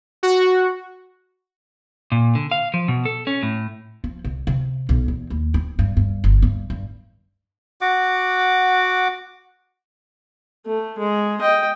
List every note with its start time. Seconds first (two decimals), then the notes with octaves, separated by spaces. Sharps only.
0.23 F#4
2.12 A#2
2.35 D3
2.52 F5
2.74 F3
2.88 B2
3.05 A4
3.27 C#4
3.43 A2
4.04 F3
4.25 C2
4.47 C3
4.89 B1
5.08 E2
5.30 D#2
5.54 C4
5.79 G2
5.97 G2
6.24 G1
6.42 G2
6.70 G2
7.81 F#4 F#5 D6
10.67 A3
10.98 G#3
11.41 D#5 G5